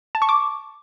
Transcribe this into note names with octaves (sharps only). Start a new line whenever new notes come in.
A5
C#6
D6